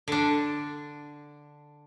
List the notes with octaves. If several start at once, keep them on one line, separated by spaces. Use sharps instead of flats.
D3 D4